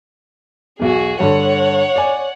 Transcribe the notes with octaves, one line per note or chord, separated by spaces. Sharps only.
B1 E2 F#4 G#4
G2 D3 C#5 F#5
D5 G#5